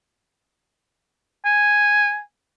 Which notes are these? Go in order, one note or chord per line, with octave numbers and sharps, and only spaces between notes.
G#5